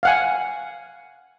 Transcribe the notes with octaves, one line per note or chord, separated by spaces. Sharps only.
F5 F#5 G#5